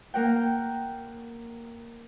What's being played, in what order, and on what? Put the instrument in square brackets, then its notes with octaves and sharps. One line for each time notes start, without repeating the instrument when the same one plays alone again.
[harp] A#3 A#4 F#5 G5